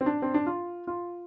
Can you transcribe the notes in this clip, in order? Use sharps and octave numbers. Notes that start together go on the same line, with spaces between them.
C4
D4
C4
D4
F4
F4